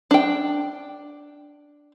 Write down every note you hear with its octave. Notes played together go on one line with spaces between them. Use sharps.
D4 G5